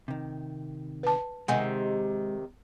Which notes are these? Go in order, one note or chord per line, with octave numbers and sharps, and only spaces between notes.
C3 D#3
B4 A5
C3 D#3 G#3 F#5 G#5